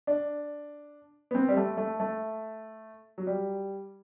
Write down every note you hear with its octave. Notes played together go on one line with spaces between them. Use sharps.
D4
B3
C4
G3
A3
A3
A3
F#3
G3